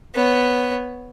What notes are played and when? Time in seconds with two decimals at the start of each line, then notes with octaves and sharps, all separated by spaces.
0.15 B3 C#5